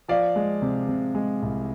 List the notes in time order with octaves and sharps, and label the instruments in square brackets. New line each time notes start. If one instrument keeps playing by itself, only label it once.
[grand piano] F3 D5 F5
G#3
C3
C3
G#3
C2